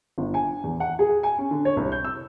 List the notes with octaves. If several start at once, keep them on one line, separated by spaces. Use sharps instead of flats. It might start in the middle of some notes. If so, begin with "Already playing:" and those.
G1
G#5
E2
F#5
G#4
G#5
C#4
D3
C#5
C2
G6
E6